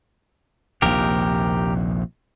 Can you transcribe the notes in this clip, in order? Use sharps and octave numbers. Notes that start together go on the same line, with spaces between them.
A#1 D#2 C3 G4 A#4